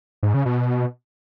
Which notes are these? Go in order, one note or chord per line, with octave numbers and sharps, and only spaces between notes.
G#2
C#3
B2